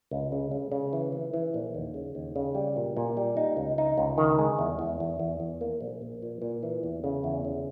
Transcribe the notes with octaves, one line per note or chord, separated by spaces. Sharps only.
C#2
C#3
C#3
C#3
E3
E3
E3
A#1
D#2
C#3
D#2
C#3
G3
A#2
A#2
G3
D#4
C#2
D#4
C#2
D#3
G#3
E2
E2
E2
E2
E2
A#3
A#1
A#1
A#2
A#2
E3
E2
C#3
E2
C#3